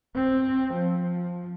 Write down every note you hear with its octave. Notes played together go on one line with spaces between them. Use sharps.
C4
F3